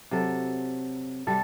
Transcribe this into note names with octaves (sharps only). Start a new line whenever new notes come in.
C3 F#3 A4
C3 G3 A4